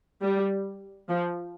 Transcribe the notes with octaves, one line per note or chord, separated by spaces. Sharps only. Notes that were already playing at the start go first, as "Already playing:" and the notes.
G3
F3